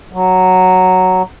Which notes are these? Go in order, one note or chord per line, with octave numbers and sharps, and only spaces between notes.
F#3